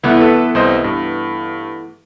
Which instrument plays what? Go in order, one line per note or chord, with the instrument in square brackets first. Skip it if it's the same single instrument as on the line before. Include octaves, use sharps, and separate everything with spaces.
[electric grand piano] C2 E4 [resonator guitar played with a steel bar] E3 A3 B3
[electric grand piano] A4 B4
C2 C5 D#5
G2